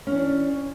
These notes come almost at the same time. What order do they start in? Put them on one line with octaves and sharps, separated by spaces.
C#4 E3 D4